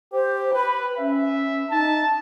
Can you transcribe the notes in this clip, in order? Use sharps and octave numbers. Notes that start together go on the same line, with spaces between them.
G4 C5
B4 B5
C#4 E5
D#4 A5